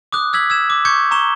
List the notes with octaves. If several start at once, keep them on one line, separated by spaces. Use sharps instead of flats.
D6 D#6 F#6
E6 G#6 B6 F#7
E6 G#6 E7
D6
C#6 D6 G6 G#6 C#7
A#5 C#6 E7 G7